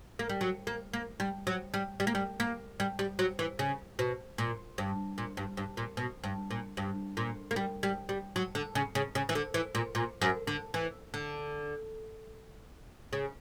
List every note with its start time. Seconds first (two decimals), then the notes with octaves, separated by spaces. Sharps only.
0.19 A#3
0.29 G3
0.41 F#3
0.67 A#3
0.93 A#3
1.20 G3
1.47 F#3
1.74 G3
2.00 G3
2.07 A#3
2.15 G3
2.40 A#3
2.80 G3
2.99 G3
3.19 F#3
3.39 E3
3.59 C#3
3.99 B2
4.38 A#2
4.78 G2
5.18 A#2
5.37 G2
5.57 G2
5.77 A#2
5.97 B2
6.24 G2
6.51 A#2
6.77 G2
7.17 A#2
7.51 A#3
7.56 G3
7.83 G3
8.09 G3
8.36 F#3
8.55 D3
8.75 C#3
8.95 C#3
9.15 C#3
9.29 E3
9.35 D3
9.54 E3
9.75 A#2
9.95 A#2
10.22 F#2
10.47 D3
10.74 E3
11.14 D3
13.13 C#3